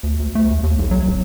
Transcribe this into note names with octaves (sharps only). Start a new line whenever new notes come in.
D2
D2
A3
D#2
D#2
B1
F#3
D1